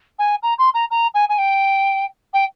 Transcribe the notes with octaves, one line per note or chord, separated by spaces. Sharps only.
G#5
A#5
C6
A#5
A#5
G#5
G#5
G5
G5